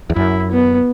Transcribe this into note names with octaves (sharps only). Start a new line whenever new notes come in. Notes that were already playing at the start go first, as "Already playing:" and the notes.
E2
F#2 E4
B3